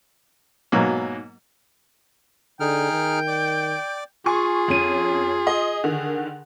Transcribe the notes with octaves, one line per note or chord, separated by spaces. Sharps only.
G#2 B2 F#3 A#3
D3 D#4 G#4 G5 F6
D#3
D5
F4 G#4 G#5 C#6
F2 C#4 D#7
D#5
D3 D#3